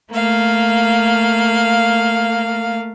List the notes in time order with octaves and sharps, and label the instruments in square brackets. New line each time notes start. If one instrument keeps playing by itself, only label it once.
[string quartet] A3 A#3 F5